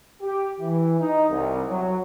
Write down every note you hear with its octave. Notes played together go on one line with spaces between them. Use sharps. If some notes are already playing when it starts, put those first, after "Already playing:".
G4
E3
D#4
C2
F#3